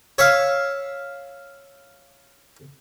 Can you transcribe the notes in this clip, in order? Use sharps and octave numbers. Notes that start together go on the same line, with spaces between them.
C#5 E5 F5